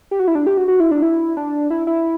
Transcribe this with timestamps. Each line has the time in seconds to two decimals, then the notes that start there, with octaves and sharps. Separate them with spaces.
0.11 G4
0.19 F#4
0.28 E4
0.35 D4
0.47 G4
0.57 F#4
0.68 F#4
0.80 E4
0.91 D4
1.02 E4
1.37 D4
1.70 E4
1.87 E4